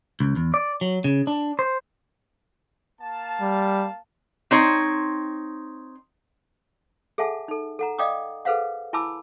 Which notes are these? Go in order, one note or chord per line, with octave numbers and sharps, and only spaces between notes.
C#2
E2
D5
F#3
C#3
D4
C5
A#3 F5 A5
G3
C4 D#4 C#5
G#4 A4 E5 F#5 G#5 A5
D#4 A4
A4 F#5 A#5
D5 D#5 F5 G5 D6 D#6
G#4 A4 B4 C5 F5 F#5
E4 G#5 A5 B5 D6 E6